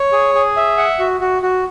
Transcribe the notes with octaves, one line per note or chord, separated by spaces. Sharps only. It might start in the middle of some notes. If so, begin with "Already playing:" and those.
Already playing: C#5
G#4
G#4
E5
F#5
F#4
F#4
F#4